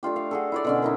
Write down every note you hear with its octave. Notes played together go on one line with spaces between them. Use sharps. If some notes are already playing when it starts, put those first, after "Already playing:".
A3 D4 F4 G4
F5
F#4 G#4 A4
E4 C#5 D5
B2 D3 C#4
D#4 E4 A#4